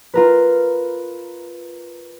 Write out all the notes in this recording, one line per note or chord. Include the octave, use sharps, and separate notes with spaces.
F4 A#4 B4